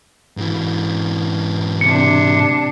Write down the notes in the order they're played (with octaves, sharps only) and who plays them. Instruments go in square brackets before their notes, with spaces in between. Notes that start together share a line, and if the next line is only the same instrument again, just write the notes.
[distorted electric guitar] G#2 E3
[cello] C3 D4 [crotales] C#7